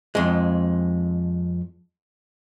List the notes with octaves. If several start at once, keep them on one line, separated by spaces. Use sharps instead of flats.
F2 G#3